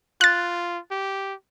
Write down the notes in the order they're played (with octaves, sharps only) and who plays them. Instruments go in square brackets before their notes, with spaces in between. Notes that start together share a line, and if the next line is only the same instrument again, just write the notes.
[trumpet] F4 [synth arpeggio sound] F#6 A6
[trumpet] G4